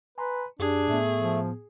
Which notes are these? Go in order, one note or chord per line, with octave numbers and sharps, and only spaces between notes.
B4 G#5 A#5 C6
F#2 D4 G4 G#4
A2 A3 B3
F3